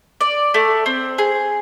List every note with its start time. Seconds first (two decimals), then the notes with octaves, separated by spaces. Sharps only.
0.21 D5
0.54 A3
0.86 C4
1.18 G#4